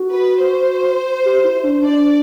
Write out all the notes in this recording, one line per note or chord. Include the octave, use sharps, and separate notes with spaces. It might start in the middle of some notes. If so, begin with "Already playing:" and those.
Already playing: F#4
B4
C5
G4
E4
D4
D4 D5